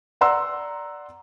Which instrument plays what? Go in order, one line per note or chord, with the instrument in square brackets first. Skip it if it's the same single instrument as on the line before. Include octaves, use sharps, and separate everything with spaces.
[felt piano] D5 F#5 A#5 C6 E6